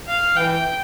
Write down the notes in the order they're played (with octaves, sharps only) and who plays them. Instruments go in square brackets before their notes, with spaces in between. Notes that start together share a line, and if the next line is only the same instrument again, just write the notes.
[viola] F5
[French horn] E3 [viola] G5